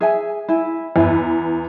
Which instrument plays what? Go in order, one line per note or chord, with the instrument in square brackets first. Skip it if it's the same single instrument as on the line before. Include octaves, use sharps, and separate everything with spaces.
[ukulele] G#4 E5 G#5
E4 G#5
[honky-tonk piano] E2 [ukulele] E4 B4